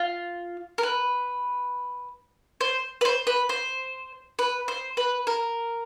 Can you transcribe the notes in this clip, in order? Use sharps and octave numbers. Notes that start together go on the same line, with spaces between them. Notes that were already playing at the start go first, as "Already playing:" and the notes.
Already playing: F4
A#4
B4
C5
B4
C5
B4
C5
B4
C5
B4
A#4